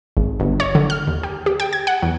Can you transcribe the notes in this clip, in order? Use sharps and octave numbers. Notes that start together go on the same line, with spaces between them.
G#1
G1
C#5
D3
F6
D#2
G4
G4
G5
G#6
F#5
E2